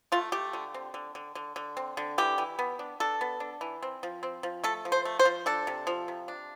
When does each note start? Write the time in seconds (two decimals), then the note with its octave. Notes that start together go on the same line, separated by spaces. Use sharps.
0.12 A3 F4
0.32 A3 G4
0.53 D3
0.74 C4
0.94 D3
1.15 D3
1.35 D3
1.56 D3
1.77 C4
1.97 D3
2.18 E3 G4
2.38 E3
2.59 B3
2.79 D4
3.00 D4 A4
3.21 B3
3.40 D4
3.61 E3
3.83 C4
4.03 F3
4.23 C4
4.43 F3
4.64 A3 A4
4.85 F3
4.92 C5
5.05 A3
5.19 C5
5.25 F3
5.46 D4 A4
5.67 C3
5.87 F3
6.08 C3
6.28 D4